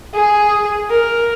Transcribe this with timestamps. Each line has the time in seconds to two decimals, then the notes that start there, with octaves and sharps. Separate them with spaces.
0.14 G#4
0.90 A#4